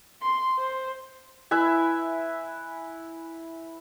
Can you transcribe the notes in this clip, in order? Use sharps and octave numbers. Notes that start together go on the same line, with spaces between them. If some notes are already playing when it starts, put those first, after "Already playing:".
C6
C5
E4 B4 E5 G#5